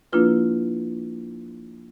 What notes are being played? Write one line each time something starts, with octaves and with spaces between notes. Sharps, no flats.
F3 A#3 D4 E4 F4 B4